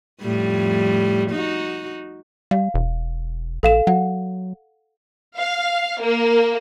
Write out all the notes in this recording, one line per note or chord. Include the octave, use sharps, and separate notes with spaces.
F2 A2 G3
D#4 F#4
G3 F5
E1
A#1 A4 F5 E7
F#3 F#5
F5
A#3